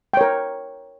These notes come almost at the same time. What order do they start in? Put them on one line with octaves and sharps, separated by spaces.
G5 C#5 A#4